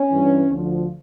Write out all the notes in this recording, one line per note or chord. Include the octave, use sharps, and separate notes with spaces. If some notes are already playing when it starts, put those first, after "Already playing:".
Already playing: C#4
G2 E3
D2 D3 F3